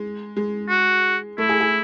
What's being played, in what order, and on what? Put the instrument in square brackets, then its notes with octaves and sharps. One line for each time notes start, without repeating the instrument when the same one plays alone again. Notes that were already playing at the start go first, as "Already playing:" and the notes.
Already playing: [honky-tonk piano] G#3
G#3
[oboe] F#4
[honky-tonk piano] A3 [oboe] E4
[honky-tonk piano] G#4
G#4